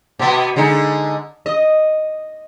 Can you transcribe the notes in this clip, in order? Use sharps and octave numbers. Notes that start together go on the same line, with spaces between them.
B2 B3
D3 G#3 D#4
D#5